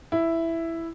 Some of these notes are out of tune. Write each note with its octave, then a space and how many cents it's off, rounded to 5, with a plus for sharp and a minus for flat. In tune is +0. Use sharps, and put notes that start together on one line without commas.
E4 +5